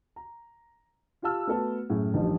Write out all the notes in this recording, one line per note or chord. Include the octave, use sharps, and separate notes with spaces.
A#5
F4 G4 F5 A5 E6 F6
A3 B3 F#4 A4 B4
F#2 A2 G#4
A1 G2 D#3 F3 G3